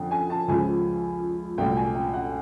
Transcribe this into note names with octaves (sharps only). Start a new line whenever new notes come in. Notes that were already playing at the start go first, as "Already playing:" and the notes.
Already playing: F2 D3 F3 G5
G#5
A5
C#2 C#3 F3 G#5
C2 A#2 F#3 A3 G5
G#5
G5
F#5